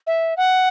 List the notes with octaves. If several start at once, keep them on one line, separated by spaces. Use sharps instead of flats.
E5
F#5